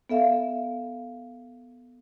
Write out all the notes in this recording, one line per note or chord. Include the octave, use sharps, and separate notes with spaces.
B3 A4 E5 F5